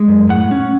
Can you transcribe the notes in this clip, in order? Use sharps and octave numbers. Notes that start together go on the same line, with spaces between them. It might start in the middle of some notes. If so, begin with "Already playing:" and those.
Already playing: G#3
F#2
A2 F#5
C#4